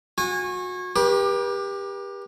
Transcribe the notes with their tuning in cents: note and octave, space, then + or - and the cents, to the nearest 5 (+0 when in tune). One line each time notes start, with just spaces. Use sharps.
F#4 -30 G#5 -25
G4 +20 B4 -45 D6 +10